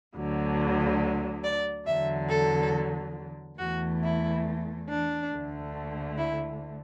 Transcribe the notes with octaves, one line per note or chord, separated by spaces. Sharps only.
D2 D3 F#3
D5
E2 D3 F#3 E5
A4
E2 E3 A3 F#4
E4
D4
D2 D3 A3
E4